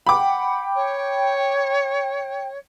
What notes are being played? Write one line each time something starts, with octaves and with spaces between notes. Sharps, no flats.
F#5 G5 B5 D6
C#5